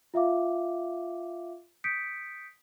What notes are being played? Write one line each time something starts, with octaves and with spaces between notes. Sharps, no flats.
F4 E5 F5 D6
D#6 G6 B6 C#7 D7